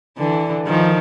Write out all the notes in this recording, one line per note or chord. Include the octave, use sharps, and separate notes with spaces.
D3 E3
D#3 F3